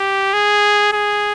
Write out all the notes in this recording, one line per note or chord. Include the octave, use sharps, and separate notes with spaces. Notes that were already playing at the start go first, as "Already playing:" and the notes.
Already playing: G4
G#4
G#4